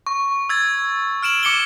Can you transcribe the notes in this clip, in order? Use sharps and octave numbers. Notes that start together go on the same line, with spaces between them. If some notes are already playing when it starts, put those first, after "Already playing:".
C#6
E6 G#6 A6
F6 D7 E7 F#7
D6 C#7 E7 G7